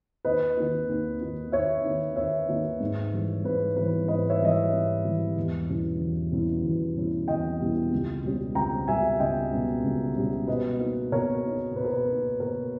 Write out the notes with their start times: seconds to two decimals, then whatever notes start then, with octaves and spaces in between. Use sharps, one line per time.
0.25 D#2 B4 D#5
0.57 D#3 A#3 D#4
0.89 D#2
1.21 D#3 A#3 D#4
1.52 D#2 C#5 E5
1.84 D#3 A#3 D#4
2.16 D#2 C#5 E5
2.48 D#3 A#3 D#4
2.80 G#2
3.12 E3 G3
3.45 G#2 B4
3.76 E3 G3 B4
4.08 G#2 B4 D#5
4.30 C#5 E5
4.41 E3 G3 D#5
4.50 C#5 E5
4.73 G#2
5.04 E3 G3
5.36 E2
5.68 B2 G3 C#4 E4
6.01 E2
6.32 B2 G3 C#4 E4
6.65 E2
6.96 B2 G3 C#4 E4
7.28 E2 D#5 G5
7.60 B2 G3 C#4 E4
7.92 C#2
8.24 B2 G3 C#4
8.55 C#2 G5 A#5
8.88 B2 G3 C#4 E5 G#5
9.19 C#2 D#5 G5
9.52 B2 G3 C#4
9.84 C#2
10.16 B2 G3 C#4
10.48 B2 B4 D#5
10.79 A#3 D#4
11.12 B2 A#4 C#5
11.44 A#3 D#4
11.75 B2 B4
11.84 A#4
11.93 B4
12.08 A#3 D#4
12.40 B2 A#4